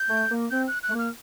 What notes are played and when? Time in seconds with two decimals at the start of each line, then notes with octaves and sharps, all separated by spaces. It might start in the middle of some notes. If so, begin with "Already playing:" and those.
Already playing: G6
0.09 A3
0.30 A#3
0.50 C4 G6
0.68 F#6
0.83 F#6
0.89 A3
0.93 A#3
0.99 F6